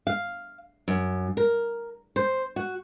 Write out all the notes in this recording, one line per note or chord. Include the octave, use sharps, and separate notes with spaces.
F5
F#2
A#4
C5
F#4